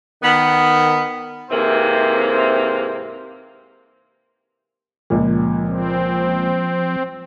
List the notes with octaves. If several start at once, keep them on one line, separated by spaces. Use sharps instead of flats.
D#3 B3
G#2 C3 E3 A#3 C4 C5
C#2 A#2 F3
C4